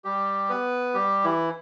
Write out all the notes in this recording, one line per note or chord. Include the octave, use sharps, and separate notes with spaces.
G3 G4
B3 B4
G3 G4
E3 E4